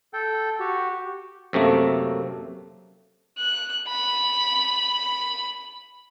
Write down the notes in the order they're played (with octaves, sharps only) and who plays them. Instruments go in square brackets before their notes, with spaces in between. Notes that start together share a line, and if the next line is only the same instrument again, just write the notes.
[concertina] A4 G5
F#4 G4
[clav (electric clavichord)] F#2 C3 A3 A#3
[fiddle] F#6
B5